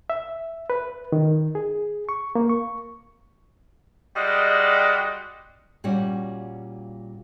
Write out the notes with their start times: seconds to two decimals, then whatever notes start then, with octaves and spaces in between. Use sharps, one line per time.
0.10 E5
0.70 B4
1.12 D#3
1.55 G#4
2.09 C#6
2.35 A#3
2.49 C#6
4.16 G3 G#3 F#4 D5 D#5
5.84 A#2 G3 C#4 F#4